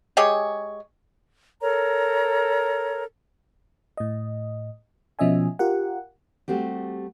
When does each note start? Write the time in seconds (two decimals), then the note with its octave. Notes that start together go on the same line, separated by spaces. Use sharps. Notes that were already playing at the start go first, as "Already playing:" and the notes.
0.17 G#3 G4 G#4 C#5
1.61 A4 A#4 C#5 A#5
3.97 A2 D#5
5.19 B2 F3 C#4 D#5 E5 G#5
5.59 F4 G4 A#4 F#5
6.48 G3 A3 C4 F#4 G4